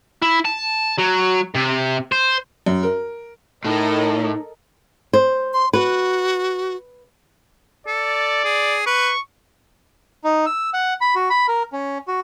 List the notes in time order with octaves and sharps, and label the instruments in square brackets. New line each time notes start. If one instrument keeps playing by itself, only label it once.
[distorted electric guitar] E4
A5
F#3
C3
C5
[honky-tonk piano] F#2
A#4
[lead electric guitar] A2 [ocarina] D#4 [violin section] A4 A#4 D#5
[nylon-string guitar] C5
[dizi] C6
[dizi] F#4 [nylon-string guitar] B4
[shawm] A4 [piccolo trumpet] D5
[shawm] G#4
[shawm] B4 [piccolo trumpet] C#6
[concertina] D#4
E6
F#5
B5
F#4
B5
A#4
C#4
F#4